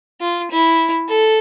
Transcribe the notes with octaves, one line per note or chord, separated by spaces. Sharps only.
F4
E4
A4